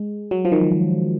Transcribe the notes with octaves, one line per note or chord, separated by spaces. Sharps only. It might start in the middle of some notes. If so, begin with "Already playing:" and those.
Already playing: G#3
F#3
F3
D#3